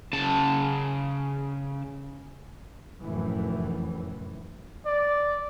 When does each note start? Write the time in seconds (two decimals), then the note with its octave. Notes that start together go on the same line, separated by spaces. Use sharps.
0.13 C#3 A5
3.01 F1 F#2 A2 E3
4.85 D5